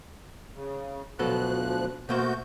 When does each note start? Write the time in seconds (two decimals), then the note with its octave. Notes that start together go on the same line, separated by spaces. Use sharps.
0.55 C#3
1.19 D2 B2 F3 F#3 A4 F#6
2.09 B2 A3 A#3 F#4 C5 G6